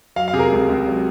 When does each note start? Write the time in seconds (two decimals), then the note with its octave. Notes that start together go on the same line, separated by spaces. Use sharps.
0.16 F#3 F5
0.28 F5
0.33 C3 G#4
0.39 A#4
0.52 C#2
0.69 C#2
0.87 F#3